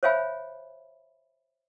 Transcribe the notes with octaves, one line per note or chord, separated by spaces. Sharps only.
C5 C#5 E5 F5 G#5 B5